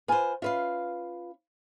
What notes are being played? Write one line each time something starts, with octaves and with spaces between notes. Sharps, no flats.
F4 B4 C5 G#5
C#4 F4 B4 E5 F5